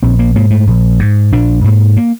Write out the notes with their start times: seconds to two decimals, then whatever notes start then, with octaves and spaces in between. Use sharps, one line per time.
0.03 A#1 C4
0.19 A#3
0.35 G#2 A#3
0.51 A3
0.67 A#1
0.99 G#2
1.32 A#1 D4
1.64 G#2 A#3
1.97 A#3